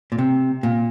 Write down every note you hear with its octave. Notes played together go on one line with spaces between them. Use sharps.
A#2
C3
A#2